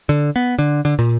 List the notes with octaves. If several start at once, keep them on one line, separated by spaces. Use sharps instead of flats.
D3
B3
D3
D3
A#2